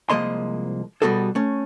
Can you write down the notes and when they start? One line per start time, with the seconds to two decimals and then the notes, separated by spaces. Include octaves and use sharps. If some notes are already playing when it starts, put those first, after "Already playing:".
0.10 C2 F3 G#3 A#3 D#5 C6
1.02 B2 G3 B3 F#4 G#4 A4
1.35 A3 C#4